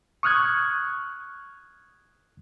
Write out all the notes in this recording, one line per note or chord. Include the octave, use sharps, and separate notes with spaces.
C#6 D#6 F6 F#6 G#6